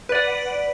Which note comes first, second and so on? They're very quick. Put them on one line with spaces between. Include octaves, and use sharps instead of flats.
B4 D5 F#5